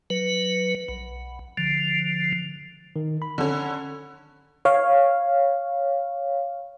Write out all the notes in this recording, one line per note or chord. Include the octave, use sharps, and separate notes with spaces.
F#3 B4
B1
D3 F3
D#3
B5
D3 C#4
C#5 F5